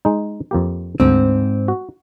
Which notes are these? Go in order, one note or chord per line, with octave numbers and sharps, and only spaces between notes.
G#3 D#4
F2 A#3 G4
D2 G#2 C4
F#4